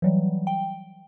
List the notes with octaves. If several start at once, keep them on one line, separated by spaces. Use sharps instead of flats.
E3 F#3 G3
G5